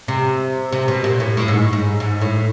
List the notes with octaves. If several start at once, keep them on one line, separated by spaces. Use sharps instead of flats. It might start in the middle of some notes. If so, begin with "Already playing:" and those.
C3
C3
B2
A#2
A2
A2
G#2
G#2
G#2
A2